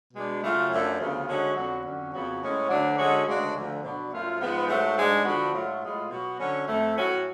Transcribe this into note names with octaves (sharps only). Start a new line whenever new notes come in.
B2 G#3 D4
C#3 F#3 A3 F4
F#2 F3 A3 D4
D2 C#3 F3 B3 F4
D3 G#3 C#4 F#4
F2 D3 F#3 B3 F#4
F2 D3 F#3 C#4
F2 C#3 F#3 B3 F#4
A2 G#3 C#4
D2 D3 F#3 A3 D4
D3 G#3 C#4 F#4
D2 C#3 G#3 D4 F#4
D2 D3 F3
B2 F#3 B3 D4
F#2 F3 A3 F4
G#2 F3 B3
G#2 F#3 A3
G#2 G#3 D4
D3 F3 B3 D4 F#4
G#2 F#3 A3 F4
A2 G#3 B3 F4
B2 F#3 B3 F#4
D3 F#3 C#4
F2 F3 A3
A2 F#3 C#4 F#4